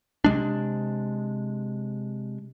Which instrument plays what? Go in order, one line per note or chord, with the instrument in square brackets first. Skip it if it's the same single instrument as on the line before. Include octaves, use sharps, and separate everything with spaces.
[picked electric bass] C3 G#3 D4